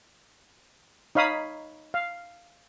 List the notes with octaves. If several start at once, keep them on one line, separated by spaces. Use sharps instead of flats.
D#4 C#5 F5 B5 D#6
F5